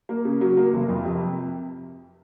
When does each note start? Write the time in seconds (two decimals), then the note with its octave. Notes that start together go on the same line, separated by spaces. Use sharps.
0.09 A#3
0.25 C#3
0.41 F#3
0.57 A#3
0.73 F1
0.89 F2
1.04 C3